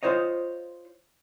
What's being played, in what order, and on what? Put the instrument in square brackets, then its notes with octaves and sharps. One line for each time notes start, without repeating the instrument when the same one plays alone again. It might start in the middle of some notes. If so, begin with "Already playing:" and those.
[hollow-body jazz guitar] F4 C5 C#5 D#5